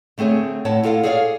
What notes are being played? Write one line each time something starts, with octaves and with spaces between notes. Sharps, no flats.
D3 A3 C4 G#4 C#5
A2 C#5 F#5 A5
A2 F4 A4 F5 F#5
G#4 A4 C#5 D5 F5